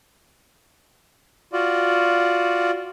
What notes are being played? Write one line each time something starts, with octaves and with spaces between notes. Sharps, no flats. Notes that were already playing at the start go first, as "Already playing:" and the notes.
F4 F#4 D5